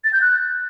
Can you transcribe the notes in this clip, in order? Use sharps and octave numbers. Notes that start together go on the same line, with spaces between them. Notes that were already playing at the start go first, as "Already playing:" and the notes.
A6
G6
F#6